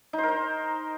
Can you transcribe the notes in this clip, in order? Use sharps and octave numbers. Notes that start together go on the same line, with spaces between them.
D#4
C5
A#4
C5